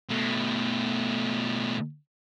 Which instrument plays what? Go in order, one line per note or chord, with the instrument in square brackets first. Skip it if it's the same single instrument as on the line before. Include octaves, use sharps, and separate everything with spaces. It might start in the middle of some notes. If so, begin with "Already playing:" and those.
[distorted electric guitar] B2 A3